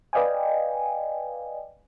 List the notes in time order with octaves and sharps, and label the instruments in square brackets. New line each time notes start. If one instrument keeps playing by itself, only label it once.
[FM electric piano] B4 D5 D#5 F5 G5 G#5